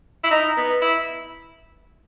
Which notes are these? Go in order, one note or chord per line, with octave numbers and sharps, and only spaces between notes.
E4
D#4
B3
E4